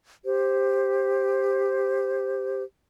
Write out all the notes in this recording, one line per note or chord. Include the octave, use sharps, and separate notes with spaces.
G4 C5